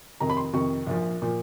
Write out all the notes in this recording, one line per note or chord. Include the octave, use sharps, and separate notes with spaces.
F2 C3 D#3 A#5
B5
C6
F2 C3 D#3 C#6
A#1 A#2 F3
A#2 F3